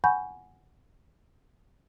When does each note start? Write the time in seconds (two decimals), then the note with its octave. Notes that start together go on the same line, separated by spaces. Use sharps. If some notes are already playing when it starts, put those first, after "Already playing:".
0.04 F#5 G#5 B5 C#6 G6